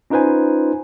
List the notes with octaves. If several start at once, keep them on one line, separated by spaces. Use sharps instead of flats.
C#4 D#4 F4 B4 C5 G#5